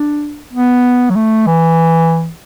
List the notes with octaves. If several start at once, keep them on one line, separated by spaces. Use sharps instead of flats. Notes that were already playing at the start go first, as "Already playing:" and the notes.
Already playing: D4
B3
F#3
A3
E3